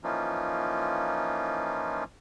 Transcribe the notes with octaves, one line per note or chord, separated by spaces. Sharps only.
E3 F3 A#3 C#4 D#4 F4